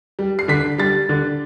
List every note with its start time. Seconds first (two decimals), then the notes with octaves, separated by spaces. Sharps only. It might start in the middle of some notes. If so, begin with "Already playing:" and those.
0.19 G3
0.39 C7
0.48 D3 B6
0.78 G3 A6
1.09 D3